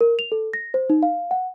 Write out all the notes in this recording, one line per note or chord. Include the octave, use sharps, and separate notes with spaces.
A#4
F7
A4
A#6
C5
D#4
F5
F#5